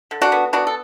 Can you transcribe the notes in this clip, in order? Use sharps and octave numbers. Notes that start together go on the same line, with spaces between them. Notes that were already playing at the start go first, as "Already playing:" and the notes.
D3
D4 F#4
B3
B3 D4 F#4
A4